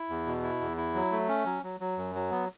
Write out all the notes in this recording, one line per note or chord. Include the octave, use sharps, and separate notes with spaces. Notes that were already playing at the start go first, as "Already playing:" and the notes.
Already playing: E4
E2
B2
E4
E2
E4
F#3
A3
C#4
F#3
F#3
F#3
F#2
F#3
B3